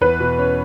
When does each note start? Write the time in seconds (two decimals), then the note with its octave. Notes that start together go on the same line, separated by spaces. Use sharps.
0.01 E2 B4
0.20 B2
0.39 C#4